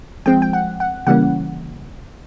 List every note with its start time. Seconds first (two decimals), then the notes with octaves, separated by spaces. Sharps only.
0.26 F3 G#3 C4 G5
0.42 G5
0.53 F#5
0.80 F#5
1.07 C#3 E3 G3 A#3 C#4 F#5